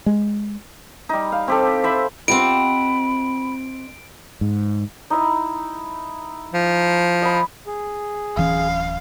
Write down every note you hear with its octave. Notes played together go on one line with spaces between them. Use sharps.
G#3
G3 D#4
F5
C4 G4 A4
C5 E5 B5
C4 F4 G4 D#5 F#5 B5 D7
G#2
D#4 E4 D#5
F3
D#5 G#5 B5
G#4
D1 E3 C#4 F5